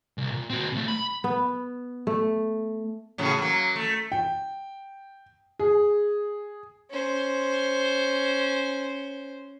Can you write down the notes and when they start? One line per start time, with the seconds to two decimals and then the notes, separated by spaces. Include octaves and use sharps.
0.18 C2
0.31 A#2
0.50 C4 F#4
0.73 B1 A3
0.88 B5
1.24 B3
2.07 A3
3.18 A2 C#3 F#3
3.38 F#3 A#3
3.76 A3
4.12 G5
5.59 G#4
6.91 C#4 C5